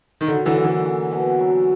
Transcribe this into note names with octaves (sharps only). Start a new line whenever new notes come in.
D#3
D3 F#3
D3 E3
A#3
D3 E3
C#4
B2
F#3